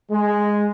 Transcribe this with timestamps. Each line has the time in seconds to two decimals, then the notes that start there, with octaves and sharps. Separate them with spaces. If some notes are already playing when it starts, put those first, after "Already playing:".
0.11 G#3